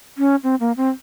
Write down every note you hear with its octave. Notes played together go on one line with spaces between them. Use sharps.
C#4
C4
A#3
C4